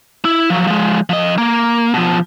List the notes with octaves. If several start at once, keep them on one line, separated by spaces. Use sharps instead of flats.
E4
F3 F#3
F3 G#3
F3 D#5
A#3
B2 F3